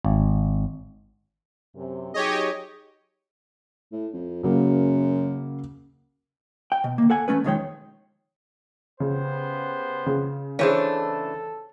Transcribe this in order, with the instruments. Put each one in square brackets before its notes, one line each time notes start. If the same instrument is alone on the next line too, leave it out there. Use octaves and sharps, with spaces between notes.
[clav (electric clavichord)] G#1
[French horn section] F#2 C3
[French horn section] F#3 D#4 G#4 [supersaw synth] G4 C#5 D#5
[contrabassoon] A2
F2
[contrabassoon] F#2 [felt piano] C#3 F#3 A#3
[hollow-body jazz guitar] G5
B2
D2 A#3
A4 F#5 G#5
E2 A2 A3 C#4 B4
B1 F2 D#3 G#3 C#5 G5
[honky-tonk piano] C#3 [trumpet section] B3 G4 C5
[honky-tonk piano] C#3
[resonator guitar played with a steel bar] E3 A3 D4 [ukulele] G#4 C5 C#5 [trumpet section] A4